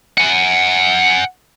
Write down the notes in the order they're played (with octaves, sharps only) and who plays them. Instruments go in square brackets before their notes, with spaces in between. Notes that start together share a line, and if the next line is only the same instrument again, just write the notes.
[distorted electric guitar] F#5 G#5